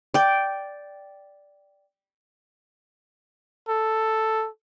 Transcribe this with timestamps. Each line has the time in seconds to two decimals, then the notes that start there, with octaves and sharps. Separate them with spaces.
0.14 D5 G5
3.69 A4